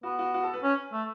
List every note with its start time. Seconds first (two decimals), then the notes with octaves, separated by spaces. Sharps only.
0.03 B3 F#4
0.19 F#4
0.34 F#4
0.43 A4
0.53 B4
0.63 C#4
0.93 A3